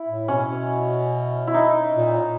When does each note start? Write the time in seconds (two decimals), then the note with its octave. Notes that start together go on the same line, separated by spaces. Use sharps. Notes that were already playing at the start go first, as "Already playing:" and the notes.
Already playing: E4
0.08 A2
0.28 B2 C#4
1.47 E4
1.54 D#4
1.96 A#2